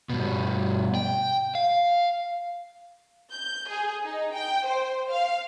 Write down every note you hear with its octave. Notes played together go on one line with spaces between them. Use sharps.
G2 B2
G5
F5
G6
G#4
D#4
G5
C5
F5